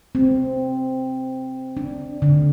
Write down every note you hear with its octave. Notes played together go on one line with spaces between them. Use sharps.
C4
D4
D3